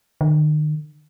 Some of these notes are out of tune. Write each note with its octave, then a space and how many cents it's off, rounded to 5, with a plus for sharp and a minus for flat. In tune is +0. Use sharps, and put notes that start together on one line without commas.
D#3 -40